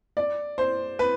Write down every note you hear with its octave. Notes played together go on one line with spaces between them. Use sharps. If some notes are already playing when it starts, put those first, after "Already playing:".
D5
C5
B4